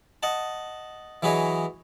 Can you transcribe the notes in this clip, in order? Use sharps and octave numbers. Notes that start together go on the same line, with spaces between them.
D#5 F#5 A5
E3 F#3 G#4 B4 C#5 D#5